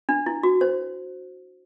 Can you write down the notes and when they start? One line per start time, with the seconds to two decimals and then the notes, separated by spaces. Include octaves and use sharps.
0.09 D4
0.26 E4
0.43 F#4
0.61 C5